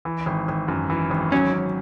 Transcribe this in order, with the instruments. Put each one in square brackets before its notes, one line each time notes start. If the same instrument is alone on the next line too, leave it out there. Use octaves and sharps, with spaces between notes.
[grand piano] E3
G#1
G#1
F#2
E3
G#1
[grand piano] F#3 [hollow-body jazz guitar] C#4
[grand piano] C#4